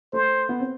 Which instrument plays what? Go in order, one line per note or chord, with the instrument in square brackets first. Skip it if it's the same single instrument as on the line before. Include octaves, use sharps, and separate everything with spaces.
[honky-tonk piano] A3 [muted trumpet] C5
[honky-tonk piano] B3
C4